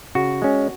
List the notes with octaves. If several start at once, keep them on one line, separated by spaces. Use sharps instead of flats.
C#3 F#4
G#3 C#4